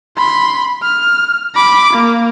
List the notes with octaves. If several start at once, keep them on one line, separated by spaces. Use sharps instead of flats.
B5 C6
F6
B5 D6
A#3